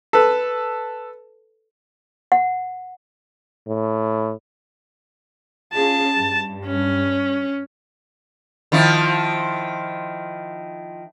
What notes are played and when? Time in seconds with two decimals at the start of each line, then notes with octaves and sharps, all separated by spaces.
0.13 A4 B4
2.32 F#5
3.68 A2
5.74 C#4 F4 G#4 A5
6.16 G2
6.66 C#4
8.72 D#3 F3 E4